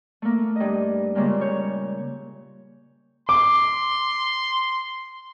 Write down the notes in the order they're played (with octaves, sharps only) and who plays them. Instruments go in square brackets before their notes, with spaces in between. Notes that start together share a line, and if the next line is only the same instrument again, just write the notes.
[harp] A3 A#3
G2 D#5
A#2 C#3 G3 G#3 A#3
C#5 G6
[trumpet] C6 [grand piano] D6